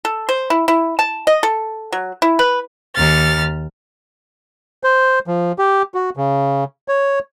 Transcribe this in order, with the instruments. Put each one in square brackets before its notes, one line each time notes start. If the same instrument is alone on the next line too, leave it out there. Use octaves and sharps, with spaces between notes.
[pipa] A4
C5
E4
E4
A5
D#5
A4
F#3
E4
B4
[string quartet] D#2 F6 A6
[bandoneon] C5
F3
G4
F#4
C#3
C#5